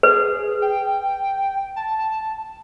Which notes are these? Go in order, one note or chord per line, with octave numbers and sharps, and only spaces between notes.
G#4 B4
G5
A5